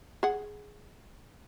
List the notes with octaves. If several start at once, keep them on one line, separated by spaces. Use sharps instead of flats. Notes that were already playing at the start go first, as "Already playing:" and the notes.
G#4 F#5